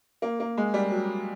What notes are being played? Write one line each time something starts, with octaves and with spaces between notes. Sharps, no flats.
A#3
A#3
G#3
G3
F#3